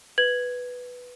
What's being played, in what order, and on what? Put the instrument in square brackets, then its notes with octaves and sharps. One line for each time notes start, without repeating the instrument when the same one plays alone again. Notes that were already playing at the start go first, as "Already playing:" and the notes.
[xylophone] B4 G#6 F#7